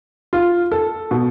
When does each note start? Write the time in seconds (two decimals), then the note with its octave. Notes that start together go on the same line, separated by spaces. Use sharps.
0.33 F4
0.72 A4
1.11 B2